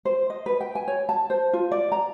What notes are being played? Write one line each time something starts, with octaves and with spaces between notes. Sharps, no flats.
C5
D#5
B4
G5
G#5
C#5
A5
C5
F4
D5
A#5